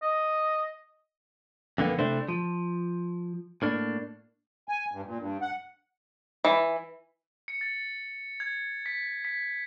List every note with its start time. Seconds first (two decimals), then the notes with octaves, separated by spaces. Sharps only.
0.02 D#5
1.78 F2 D3 A#3 B3
1.99 C3 A3 D4 E4 C5
2.29 F3
3.62 A2 A#3 D4
4.69 G#5
4.92 G2
5.05 A#2
5.18 G2
5.41 F#5
6.45 E3
7.48 C#7
7.61 A6
8.40 G#6
8.86 B6
9.25 B6